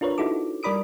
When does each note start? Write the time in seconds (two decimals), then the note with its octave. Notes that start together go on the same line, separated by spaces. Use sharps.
0.01 D4 F4 A#4 B4 C#5
0.18 D#4 E4 F#4 A4 D6
0.63 G3 A#4 D5 B5 D#6 D7